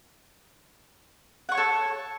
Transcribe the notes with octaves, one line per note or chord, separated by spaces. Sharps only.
A4 C#5 F#5 C#6